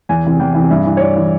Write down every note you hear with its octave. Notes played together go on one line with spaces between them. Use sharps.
E2 G#5
C3 E3
E2 G5
C3 E3
G2 E5
E3
C#5
G2 D5
E3